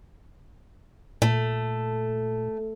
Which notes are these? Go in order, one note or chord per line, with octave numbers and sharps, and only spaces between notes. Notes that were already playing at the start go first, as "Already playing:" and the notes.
A#2 A3